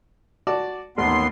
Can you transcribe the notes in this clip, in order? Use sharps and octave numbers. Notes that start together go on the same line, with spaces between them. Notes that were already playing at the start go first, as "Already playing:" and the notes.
F#4 D5 A5
A1 D#2 B3 C6